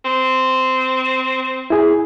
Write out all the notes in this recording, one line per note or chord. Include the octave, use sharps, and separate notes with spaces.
C4
E4 G#4